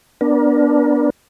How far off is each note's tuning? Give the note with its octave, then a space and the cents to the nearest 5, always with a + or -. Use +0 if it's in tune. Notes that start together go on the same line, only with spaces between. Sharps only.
B3 +0 D4 +0 A#4 +35